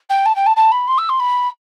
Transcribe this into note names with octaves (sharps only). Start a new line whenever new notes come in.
G5
A5
G5
A5
A5
B5
C6
E6
C6
B5